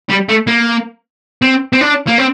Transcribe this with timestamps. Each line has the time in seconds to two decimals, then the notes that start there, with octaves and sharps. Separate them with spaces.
0.09 G3
0.29 A3
0.47 A#3
1.42 C4
1.73 C4
1.81 D4
2.07 A#3
2.18 C4